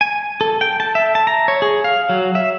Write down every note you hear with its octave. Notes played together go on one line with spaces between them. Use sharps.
G#5
A4
G5
A5
E5
A5
A#5
C#5
G#4
F5
F#3
E5